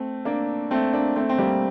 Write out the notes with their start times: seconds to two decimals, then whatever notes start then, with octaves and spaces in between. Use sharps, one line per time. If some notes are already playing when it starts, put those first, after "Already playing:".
Already playing: A3 C4
0.25 A#3 D4
0.71 A3 C4
0.93 A#3 D4
1.16 A3 C4
1.29 C4
1.38 G3 A#3